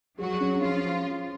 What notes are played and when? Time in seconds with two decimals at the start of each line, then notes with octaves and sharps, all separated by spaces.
0.18 F#3 F#4 G#4
0.40 C#4
0.61 F3 C#4 F4